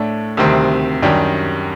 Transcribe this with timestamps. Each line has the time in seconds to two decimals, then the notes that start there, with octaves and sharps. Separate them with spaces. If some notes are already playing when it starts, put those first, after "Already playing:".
Already playing: A2 A3 D4
0.37 D2 C3 D#3 G3 C4
1.03 F#2 D#3 G3 D4 G4